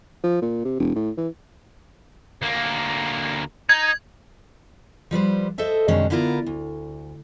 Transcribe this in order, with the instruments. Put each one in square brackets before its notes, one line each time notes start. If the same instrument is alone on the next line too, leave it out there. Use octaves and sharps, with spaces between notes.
[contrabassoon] F3
A#2
C3
E1
A2
E3
[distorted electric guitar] D2 A#3
[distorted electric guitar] D#4 [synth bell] G#6
[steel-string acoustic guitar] F3 G3 B4 C5
A4 C5 D#5 E5 A5
F#2 C3 D#3 G#3 C#4 D4
D3 B3 E4 F4 A4 A#4
D2